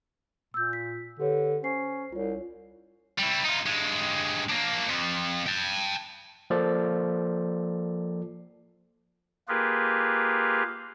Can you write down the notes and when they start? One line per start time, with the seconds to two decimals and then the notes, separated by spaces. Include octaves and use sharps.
0.54 A#2 E6 G6
0.73 B6
1.19 D3 G4 B4 C#5
1.63 C#4 C5 C7
2.12 C2 F4 C#5
3.19 G3 E4
3.45 D#4 F4
3.66 G2 G#3
4.50 A#3 D4
4.89 F2 F3
5.47 G5 A5
6.50 F3 A#3 A4 C5 D5
9.48 A#3 F4 G4 G#4 A#4 B4